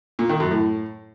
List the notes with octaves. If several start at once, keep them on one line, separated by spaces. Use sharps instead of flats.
A#2
D#3
F#2
A2